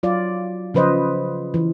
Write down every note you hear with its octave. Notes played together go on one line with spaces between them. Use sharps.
F#3 F4 D5
C#3 F3 B4 C5 D#5
E3